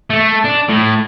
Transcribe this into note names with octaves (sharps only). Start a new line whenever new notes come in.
A3
D4
A2